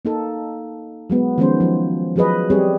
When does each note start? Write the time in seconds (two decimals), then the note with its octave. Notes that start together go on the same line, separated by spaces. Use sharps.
0.05 A#3 D#4 A4
1.10 F#3 G#3 B3
1.38 D#3 F3 G#3 B3 C#4 C5
1.60 F3 F#3
2.16 F3 F#3 G#4 B4 D#5
2.50 G3 C4 G#4 C#5